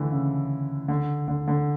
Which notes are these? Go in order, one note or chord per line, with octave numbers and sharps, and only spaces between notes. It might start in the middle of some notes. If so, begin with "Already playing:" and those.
Already playing: D3 E3 A3
C#3
D3
D3
D3